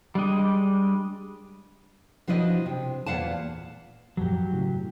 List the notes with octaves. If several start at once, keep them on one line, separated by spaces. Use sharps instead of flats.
G3 G#3 D4 D#5
B2 F3 D4 E4 D#5
C3
E2 A#2 F5 F#5 A5
F#2 A#2 F3 F#3 G4
A2 C#3